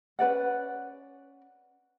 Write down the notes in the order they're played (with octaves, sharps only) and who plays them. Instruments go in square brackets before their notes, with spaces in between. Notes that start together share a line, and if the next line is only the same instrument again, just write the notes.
[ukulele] C#4 B4 D5 F#5